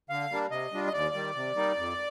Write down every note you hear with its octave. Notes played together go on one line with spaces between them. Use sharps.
D3 F5
G3 A#3 D4
C3 D#5
G3 D4 F4
D#5
D#2 D5
D#3 G3
C3
G3 A#3 D#4
F2